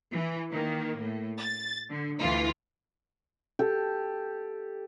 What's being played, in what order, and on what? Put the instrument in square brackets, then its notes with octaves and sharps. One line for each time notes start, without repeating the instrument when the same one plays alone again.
[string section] E3
D#3 A#3
A2
A6
D3
D2 E3 F4
[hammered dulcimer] G4 A4